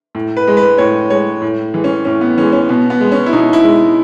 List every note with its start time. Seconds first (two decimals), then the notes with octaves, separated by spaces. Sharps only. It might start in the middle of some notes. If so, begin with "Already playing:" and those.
0.15 A2
0.37 B4
0.47 G#3
0.57 B4
0.78 A2 C#5
1.10 G#3 C#5
1.42 A2
1.74 E3 G#3
1.84 C#4
2.05 A2 C#4
2.21 B3
2.37 E3 G#3 C#4
2.53 C#4
2.69 B2 B3
2.90 B3
3.01 G#3
3.12 C#4
3.26 E4
3.33 B2 D#4
3.53 E4
3.64 G#3